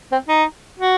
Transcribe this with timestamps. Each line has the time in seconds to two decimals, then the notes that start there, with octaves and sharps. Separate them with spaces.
0.12 C4
0.28 D#4
0.79 F#4